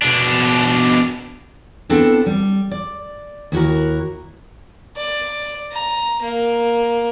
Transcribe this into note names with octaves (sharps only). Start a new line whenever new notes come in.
B2 D4
B3 C4 D4 E4 A4
G3
D5
D#2 E4 F#4 A#4
D5
A#5
A#3